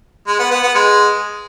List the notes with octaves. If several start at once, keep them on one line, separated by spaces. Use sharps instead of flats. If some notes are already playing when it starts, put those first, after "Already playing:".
G#3
B3
B3
B3
G#3